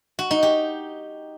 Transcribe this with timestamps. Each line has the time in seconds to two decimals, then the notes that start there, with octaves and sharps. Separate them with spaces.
0.19 F#4
0.31 D#4
0.43 G4